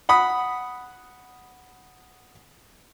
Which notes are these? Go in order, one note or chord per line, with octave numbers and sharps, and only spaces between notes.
F#5 B5 D#6